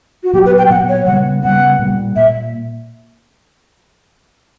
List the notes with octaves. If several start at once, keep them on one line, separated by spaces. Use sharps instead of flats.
F#4
A#2 F#3 B3 G4
B4
G5
A#2 F#3 B3 F#5
C#5
C#3 G3 B3 F#5
C#3 G3 B3 F#5
A#2 G3 A#3
A#2 E5